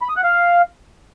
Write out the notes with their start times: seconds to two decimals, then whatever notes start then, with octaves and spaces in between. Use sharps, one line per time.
0.02 B5
0.09 D#6
0.16 F#5
0.24 F5